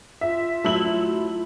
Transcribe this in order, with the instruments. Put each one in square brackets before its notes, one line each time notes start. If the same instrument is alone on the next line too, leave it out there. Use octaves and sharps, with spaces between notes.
[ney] F4 [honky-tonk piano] E5
[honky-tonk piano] F#3 E6 F#7 [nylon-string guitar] A3 E4